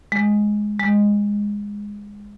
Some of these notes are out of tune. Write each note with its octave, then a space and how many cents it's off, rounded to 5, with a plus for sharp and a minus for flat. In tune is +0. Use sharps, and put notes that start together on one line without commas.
G#3 +5
G#3 -15